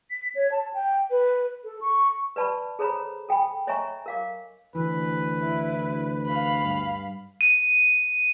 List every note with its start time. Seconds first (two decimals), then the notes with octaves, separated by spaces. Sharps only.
0.10 B6
0.35 C#5
0.52 A5
0.74 G5
1.10 B4
1.64 A4
1.81 C#6
2.36 B4 D5 A5 B5 C#6
2.79 G#4 A4 C5 C#5 A#5 B5
3.29 A4 G5 G#5 B5
3.67 C#5 D#5 E5 G#5 A#5 C#6
4.06 A#4 F5 D6
4.75 D2 E3 B4
5.40 E4
6.26 F5 B5
6.63 G2
7.41 D#7